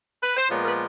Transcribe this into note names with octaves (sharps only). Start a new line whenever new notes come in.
B4
C5
A#2 F3 G#3 B3 C#5
A#4
B4